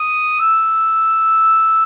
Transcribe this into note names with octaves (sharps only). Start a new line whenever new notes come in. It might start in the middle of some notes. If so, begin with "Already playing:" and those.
Already playing: D#6
E6